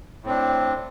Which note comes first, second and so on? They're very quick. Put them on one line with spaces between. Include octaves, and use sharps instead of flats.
A2 C4 D4